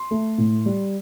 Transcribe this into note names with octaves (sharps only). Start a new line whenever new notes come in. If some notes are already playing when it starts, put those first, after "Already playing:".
Already playing: C6
A3
A2
G3